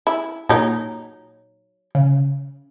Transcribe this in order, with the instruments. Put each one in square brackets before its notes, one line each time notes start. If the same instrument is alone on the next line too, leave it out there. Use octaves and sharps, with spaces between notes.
[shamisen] E4
[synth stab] A#2 [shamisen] F#3 D#4
[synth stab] C#3